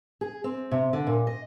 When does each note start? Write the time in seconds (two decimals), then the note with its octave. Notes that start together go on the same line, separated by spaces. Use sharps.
0.21 G#4
0.44 C4
0.71 C3
0.93 D3
1.07 A#2
1.27 D#5